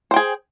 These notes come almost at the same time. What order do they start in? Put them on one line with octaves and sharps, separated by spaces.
C5 G5 G#4